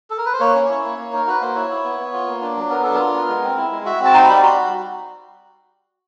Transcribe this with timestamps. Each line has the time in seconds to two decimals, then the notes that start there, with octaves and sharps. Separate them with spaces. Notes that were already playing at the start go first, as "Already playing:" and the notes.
0.10 A4
0.18 A#4
0.25 B4
0.33 C5
0.40 A#3 C#5
0.55 C#4
0.69 E4
0.84 A#3
0.98 A#3
1.13 D#4 A#4
1.27 F#4 B4
1.41 A#3 C5
1.55 E4 C#5
1.71 E4
1.84 B3
1.99 B3
2.13 F4
2.27 A#3
2.42 D4
2.56 F#3
2.70 B3 A#4
2.83 D4 A4
2.95 F4 A#4
3.14 B3
3.28 G#3
3.43 C4
3.57 E4
3.71 G#3
3.85 F#4 E5
4.00 C4
4.05 A5
4.14 D#4 C6
4.25 G3 B5
4.43 F#4 C6